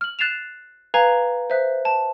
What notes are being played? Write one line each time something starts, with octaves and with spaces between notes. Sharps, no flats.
F6 F#7
F#6 A6 C7 E7 F7
B4 F5 G#5 A#5 G#6
C5 E5 F#6
A5